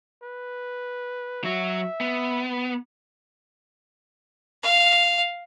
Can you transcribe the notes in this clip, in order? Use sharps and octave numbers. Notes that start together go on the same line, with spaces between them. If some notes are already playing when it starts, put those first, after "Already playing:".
B4
F#3 F#4 E5
B3
F5